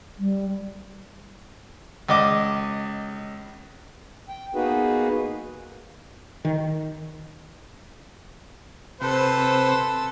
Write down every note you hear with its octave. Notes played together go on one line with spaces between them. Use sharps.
G3
C#2 D#5 D6
G5
A#3 B3 D#4 F#4 G#4 B4
D#3
C3 A4 B4 C5 E6